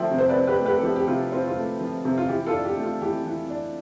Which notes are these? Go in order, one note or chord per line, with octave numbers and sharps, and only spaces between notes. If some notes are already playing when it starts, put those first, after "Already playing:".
Already playing: F3 A3 E5 G5 A5 C6
C3
C5
B4 D5
C4
G4 B4
A3
G4 B4
A4
F3 G4
G4
C3 F4
C4 F4
F4
A3
F3
C3
F4
E3 G4
F4 A4
D4
G4
A3
F4
E3 G4
E3
D4